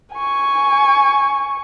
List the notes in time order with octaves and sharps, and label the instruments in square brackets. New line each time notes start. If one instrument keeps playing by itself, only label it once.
[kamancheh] G#5 C#6